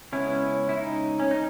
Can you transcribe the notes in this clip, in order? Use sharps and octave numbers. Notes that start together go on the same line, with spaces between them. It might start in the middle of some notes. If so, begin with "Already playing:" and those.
C#3 G#3 B3 C#4 E4
E4
D#4
C#4
D#4